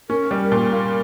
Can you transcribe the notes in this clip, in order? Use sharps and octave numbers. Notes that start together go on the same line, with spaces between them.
C#4 A#4
G3
A#2
A#3